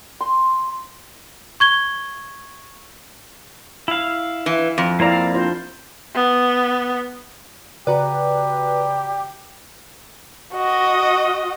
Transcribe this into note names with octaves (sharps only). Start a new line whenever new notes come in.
C6
C#6 G#6 G7
E4 F5
E3
F2
A#3 C4 E4 D5 F5 A#5
D4 F4 C5
B3
C#3 F#4 G4 B4 D5 A#5 B5
F#4 D#5